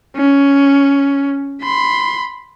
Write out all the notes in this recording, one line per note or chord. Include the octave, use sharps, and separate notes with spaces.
C#4
B5 C6